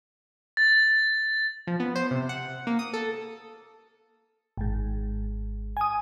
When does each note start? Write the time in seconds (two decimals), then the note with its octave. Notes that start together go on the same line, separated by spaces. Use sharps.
0.57 A6
1.67 F3
1.80 B3
1.96 C5
2.11 C3
2.29 F#5
2.67 A#3
2.79 D#6
2.93 A4
4.57 G#1 G#2
5.77 G#5 D#6